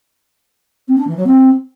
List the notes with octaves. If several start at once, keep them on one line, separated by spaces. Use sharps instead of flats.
C4
D4
E3
F#3
C4